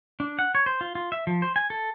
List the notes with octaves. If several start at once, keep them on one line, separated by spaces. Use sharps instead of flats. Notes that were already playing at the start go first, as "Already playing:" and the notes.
D4
F#5
C#5
C5
F4
F4
E5
F3
C5
G#5
A4